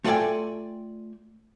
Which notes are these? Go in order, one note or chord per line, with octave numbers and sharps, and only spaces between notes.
A3 F4 A4 D5 G5 G#5